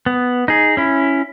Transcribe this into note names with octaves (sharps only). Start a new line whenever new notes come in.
B3
D#4 G#4
C#4 E4